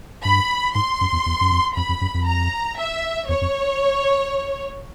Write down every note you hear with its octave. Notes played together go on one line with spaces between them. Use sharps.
G2 B5
G#2 C6
F#2
E2
E2
F#2
F2
F2 B5
F2
F#2
F2
A#5
E5
E2 C#5
F2